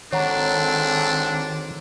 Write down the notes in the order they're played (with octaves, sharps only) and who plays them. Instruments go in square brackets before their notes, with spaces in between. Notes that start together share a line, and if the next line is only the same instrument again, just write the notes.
[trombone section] G#1 C4 A4 [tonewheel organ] D#3 [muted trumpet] D4 [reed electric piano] C#5 F#5 A#5